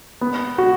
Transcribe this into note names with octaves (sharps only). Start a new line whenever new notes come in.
B3
F#4